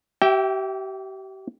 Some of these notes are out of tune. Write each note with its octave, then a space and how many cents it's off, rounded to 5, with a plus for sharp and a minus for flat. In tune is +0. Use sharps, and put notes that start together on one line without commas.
G4 -35 E5 +0 G5 +0